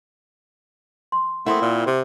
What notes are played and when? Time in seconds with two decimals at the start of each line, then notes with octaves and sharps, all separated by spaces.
1.12 C6
1.46 A3 A#3 C4 E4 F#5 C6 D#6
1.62 A#2
1.87 C3